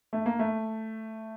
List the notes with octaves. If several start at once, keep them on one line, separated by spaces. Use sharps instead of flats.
A3
A#3
A3